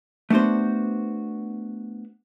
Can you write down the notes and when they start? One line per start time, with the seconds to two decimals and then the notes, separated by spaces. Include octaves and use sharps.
0.30 A3 B3 D4 F#4 C5